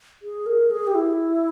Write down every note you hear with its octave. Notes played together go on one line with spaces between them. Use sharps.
G#4
A#4
G#4
G4
E4